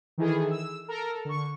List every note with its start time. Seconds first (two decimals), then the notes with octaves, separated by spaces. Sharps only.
0.18 D#3 E3 E4 G#4 A4
0.51 E6
0.88 A4 A#4 A#5
1.12 A4
1.25 D3 C#6